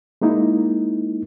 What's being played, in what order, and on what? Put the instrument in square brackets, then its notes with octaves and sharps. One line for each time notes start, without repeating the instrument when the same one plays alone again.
[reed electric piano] G#3 A#3 D#4 E4